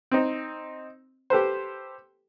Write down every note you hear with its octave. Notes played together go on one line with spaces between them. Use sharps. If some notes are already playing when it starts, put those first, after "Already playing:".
C4 D#4
G4 A4 B4 C5